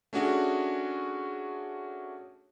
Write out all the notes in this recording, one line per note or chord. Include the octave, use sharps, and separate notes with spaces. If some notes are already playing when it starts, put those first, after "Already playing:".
A3 C#4 D4 F#4 G#4